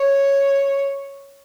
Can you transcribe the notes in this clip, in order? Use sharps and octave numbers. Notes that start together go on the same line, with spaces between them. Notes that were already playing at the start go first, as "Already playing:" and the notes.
Already playing: C#5